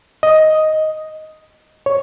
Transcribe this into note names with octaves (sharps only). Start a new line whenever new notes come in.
D#5
C#5